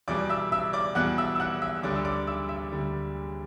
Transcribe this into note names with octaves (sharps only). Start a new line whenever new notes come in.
E2 B2 G3 D5 D6
E5 E6
E5 E6
D5 D6
E2 B2 G3 F#5 F#6
E5 E6
E6
F#5 F#6
E5 E6
D2 D3 G3 D5 D6
E6
D5 D6
E5 E6
E5 E6
D2 D3 G3